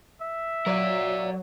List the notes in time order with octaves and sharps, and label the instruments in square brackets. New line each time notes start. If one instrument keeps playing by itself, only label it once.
[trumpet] E5
[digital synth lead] F#3 [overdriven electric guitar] A#4 D5